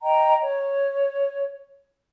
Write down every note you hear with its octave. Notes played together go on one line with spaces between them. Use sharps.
D#5 G5 A#5
C#5